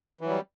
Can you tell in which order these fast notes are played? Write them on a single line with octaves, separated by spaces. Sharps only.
E3 F#3 G3